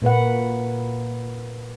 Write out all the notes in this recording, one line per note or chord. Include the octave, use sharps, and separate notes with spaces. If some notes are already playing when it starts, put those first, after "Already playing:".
A#2 A#3 B4 F#5